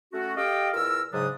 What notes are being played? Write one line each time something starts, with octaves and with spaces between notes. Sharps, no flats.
A3 C#4 F#4
G4 A4 D#5 F5 G5
E2 F4 A#4 E6
G#2 C#3 F#3 D4 D#6